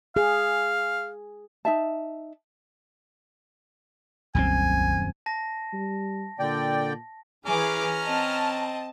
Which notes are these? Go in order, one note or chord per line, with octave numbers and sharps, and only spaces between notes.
G#4 F5
D#4 E5 A5
D#1 C2 F#2 C4 G#5
A5 A#6
G3
A#2 D3 D5 G5
E3 C#4 G#4 B4 A#5 D6 F6
C4 D#5 A5